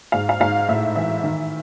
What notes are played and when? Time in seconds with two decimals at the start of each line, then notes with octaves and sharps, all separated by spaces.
0.12 G#2 F5
0.29 F5
0.40 G#2 F5
0.69 A2 E5
0.96 E3 E5
1.24 D#3